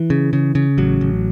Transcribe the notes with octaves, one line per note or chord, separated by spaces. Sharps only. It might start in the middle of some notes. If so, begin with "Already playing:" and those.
Already playing: E3
C#3
C#3
C#3
A1 F#3
A1